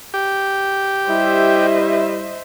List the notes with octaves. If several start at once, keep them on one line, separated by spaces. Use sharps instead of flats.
G4
G3 E4 C5 D#5 E5